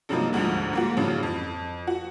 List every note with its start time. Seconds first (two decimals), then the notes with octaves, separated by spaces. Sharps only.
0.09 G2 C3 F3 F#3 A#3 D#4
0.33 G1 D2 G#2 D3 F3
0.73 G#2 A#3 F#4
0.97 A1 G2 C#3 F3
1.23 F2
1.87 F#4